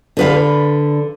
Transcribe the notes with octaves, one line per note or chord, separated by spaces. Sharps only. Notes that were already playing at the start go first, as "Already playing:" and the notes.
D3 B4 F5